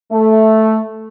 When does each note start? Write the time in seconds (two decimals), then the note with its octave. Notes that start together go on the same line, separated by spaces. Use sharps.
0.12 A3